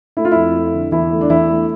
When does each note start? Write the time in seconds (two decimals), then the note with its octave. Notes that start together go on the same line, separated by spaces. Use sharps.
0.17 A3 E4
0.25 F4
0.32 F2 E4
0.55 A3
0.73 D3
0.92 E2 E4
1.11 A3
1.21 D4
1.29 E2 E4
1.49 A3